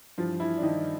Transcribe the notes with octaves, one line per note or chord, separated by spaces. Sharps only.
G2 E3 F3 F4
E3 E4
D4
D#3 D#4